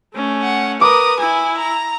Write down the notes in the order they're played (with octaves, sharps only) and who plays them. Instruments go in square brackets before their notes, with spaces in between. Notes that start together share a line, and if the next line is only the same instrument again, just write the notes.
[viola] A3 C#4
[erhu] F#5
[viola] A#4 B4 [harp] D6 [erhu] D#6
[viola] E4 [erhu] G#5
[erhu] A#5